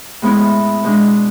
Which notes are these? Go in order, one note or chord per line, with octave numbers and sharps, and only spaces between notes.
A2 G#3 B3 E4
B2 G#3 D4